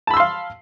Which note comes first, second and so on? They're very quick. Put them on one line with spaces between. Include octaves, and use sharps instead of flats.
A5 B5 E6 C6 F5